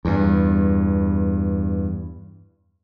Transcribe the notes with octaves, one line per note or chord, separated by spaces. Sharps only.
E2 G2